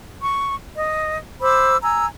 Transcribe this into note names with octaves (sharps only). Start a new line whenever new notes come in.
C#6
D#5
C5 B5 D6 E6
G#5 A#5 E6